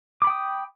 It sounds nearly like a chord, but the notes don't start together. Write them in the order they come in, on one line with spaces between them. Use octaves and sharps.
D6 B5 G5 D#6